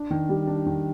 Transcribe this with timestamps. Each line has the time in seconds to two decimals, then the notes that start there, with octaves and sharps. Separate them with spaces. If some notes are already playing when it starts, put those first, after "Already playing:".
Already playing: D4
0.11 D#3
0.29 G3
0.47 D4
0.66 D#3